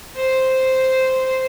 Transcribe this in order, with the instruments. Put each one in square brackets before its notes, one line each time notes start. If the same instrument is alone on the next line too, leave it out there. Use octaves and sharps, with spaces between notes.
[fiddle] C5